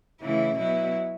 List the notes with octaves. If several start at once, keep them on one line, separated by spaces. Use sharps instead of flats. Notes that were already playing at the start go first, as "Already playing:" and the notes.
C#3 E3 A3 E4
B2 F#3 B3 E4